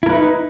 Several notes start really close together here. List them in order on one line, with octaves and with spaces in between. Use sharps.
E4 A#4 B4 D#4